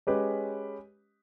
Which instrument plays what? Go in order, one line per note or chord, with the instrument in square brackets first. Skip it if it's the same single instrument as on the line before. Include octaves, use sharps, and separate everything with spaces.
[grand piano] G#3 C#4 G4 B4 D#5